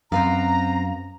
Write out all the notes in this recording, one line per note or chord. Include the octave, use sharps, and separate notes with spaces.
F#2 C4 B4 F5 A#5